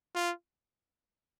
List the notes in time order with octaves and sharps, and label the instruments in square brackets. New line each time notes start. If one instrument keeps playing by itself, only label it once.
[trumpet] F4